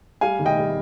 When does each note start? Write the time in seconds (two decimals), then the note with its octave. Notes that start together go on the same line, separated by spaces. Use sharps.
0.21 G3 F5 G#5
0.39 D#3
0.46 D#5 G5
0.58 G3